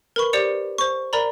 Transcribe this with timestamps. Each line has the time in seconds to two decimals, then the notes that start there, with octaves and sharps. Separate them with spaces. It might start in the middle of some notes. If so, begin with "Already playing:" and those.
0.16 A#4 B4 B5 C#6
0.33 G4 C5 D5 C#7 F7
0.78 C5 C#6
1.13 A#4 D5 A#5 B5